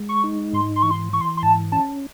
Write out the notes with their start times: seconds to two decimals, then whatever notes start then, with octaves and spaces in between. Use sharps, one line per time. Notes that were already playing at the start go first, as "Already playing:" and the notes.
Already playing: G#3
0.09 C#6
0.24 D#4
0.53 G#2 C6
0.76 C6
0.82 E3 C#6
0.91 C6
1.13 E3 C#6
1.21 C6
1.37 C6
1.43 G#2 A5
1.72 C#4 A5